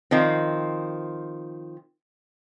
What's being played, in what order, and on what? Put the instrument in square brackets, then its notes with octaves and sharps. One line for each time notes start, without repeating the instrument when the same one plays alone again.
[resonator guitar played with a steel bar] D#3 F3 C4